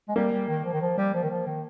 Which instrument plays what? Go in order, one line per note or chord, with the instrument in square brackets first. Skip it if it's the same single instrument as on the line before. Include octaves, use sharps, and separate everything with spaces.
[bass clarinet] G#3
[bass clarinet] G3 [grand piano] A#3
[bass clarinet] G3
D#3
F3
D#3
F3
G3
F3
D#3
F3
D#3